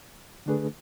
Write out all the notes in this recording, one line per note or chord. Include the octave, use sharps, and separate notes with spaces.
D3 A3 D4 G#4 B4